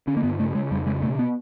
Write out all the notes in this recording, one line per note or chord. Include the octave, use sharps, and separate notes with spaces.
D3 C#4
A#3
G2 B3
C#3 A3
C#3 G#3
F2 G3
C#3 G#3
B2 A3
B3